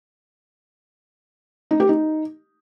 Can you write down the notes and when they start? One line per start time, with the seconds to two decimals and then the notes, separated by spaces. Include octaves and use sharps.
1.71 D#4
1.80 G4
1.89 D#4